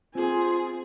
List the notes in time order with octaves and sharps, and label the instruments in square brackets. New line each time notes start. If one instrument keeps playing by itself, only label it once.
[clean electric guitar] C4 [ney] F4 [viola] G#4 G#5